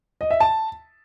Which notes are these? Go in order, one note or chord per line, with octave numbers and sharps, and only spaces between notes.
D#5
E5
A5